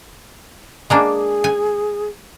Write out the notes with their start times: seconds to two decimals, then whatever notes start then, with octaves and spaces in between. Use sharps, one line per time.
0.90 G#3 A#3 D4 G#4
1.44 G#5